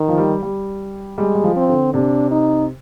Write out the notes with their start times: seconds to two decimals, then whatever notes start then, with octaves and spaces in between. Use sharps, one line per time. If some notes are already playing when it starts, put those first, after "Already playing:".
Already playing: D#3
0.08 F3
0.18 G3
0.42 G3
1.18 G3 G#3
1.35 G3
1.44 F3
1.56 C4
1.69 D3
1.94 C3 D4
2.31 D#4